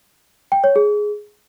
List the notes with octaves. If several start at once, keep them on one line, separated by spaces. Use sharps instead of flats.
G5
C#5
G#4